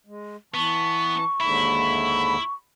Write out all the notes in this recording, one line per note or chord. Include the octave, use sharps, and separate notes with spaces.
G#3
E3 B3 A5 C#6
D#2 G#2 D3 E4 B5